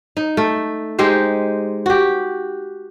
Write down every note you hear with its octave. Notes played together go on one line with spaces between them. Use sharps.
D#4
A3
G#3 D#4 G4 C5
F#4 G4